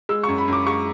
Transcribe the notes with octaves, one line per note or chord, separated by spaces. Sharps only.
G#3 E6
F#2 C#6
B5
F#2 D6
G#3 C#6